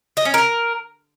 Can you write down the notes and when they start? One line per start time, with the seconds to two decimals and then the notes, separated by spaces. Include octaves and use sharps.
0.17 D#5
0.25 C#4
0.34 A#4